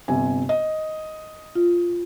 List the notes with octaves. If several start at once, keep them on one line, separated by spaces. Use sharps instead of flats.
G1 C3 G#5
D#5
F4